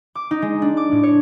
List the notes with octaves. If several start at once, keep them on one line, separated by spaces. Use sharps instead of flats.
D6
D#4
G#3
D4
D6
A2
C#5